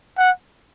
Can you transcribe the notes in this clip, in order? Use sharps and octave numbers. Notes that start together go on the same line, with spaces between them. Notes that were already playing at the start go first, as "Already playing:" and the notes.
F#5